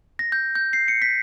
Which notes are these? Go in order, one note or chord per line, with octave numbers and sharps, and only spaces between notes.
A#6
G6
G6
C7
C#7
B6